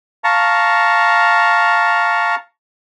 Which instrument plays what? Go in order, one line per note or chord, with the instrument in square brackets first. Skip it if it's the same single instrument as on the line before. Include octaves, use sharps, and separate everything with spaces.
[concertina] F5 A5 A#5 C#6